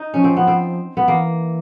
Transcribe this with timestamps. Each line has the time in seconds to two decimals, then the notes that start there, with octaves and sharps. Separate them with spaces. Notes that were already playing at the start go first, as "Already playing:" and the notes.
Already playing: D#4
0.14 F3 C#4
0.24 C4
0.37 B3
0.47 C4
0.97 B3
1.07 E3 A#3